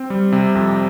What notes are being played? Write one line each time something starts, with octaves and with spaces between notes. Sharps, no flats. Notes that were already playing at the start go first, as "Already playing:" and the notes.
Already playing: C4
G3
C3
F2